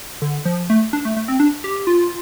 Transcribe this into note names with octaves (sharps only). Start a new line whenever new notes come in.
D3
F3
A3
D4
A3
A3
C4
D4
G4
F4